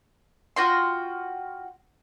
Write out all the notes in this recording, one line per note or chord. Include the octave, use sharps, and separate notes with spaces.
F4 F#4 G5 C6